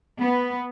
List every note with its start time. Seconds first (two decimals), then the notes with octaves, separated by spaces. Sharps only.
0.21 B3